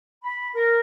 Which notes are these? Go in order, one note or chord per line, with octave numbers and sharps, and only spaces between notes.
B5
A#4